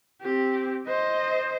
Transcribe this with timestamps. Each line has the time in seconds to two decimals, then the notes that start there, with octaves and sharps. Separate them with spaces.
0.21 C4 G4
0.87 C5 D#5